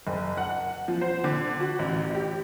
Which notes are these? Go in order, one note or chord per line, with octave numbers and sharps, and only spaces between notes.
F#1
F#5
F3
C5
D3
F#4
A1
G4